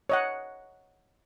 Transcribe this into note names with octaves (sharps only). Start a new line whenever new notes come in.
C#5 D#5 F#5